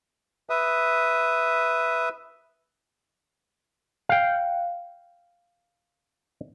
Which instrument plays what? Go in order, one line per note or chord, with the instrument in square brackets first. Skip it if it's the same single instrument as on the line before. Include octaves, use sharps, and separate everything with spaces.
[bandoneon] B4 E5 D#6
[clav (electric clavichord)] F5 G5